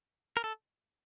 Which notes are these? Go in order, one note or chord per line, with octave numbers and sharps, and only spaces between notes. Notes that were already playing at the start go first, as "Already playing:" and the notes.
A#4
A4